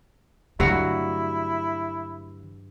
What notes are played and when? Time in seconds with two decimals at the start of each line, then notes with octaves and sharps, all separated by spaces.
0.60 G2 D3 F#3 A3 E4 F#4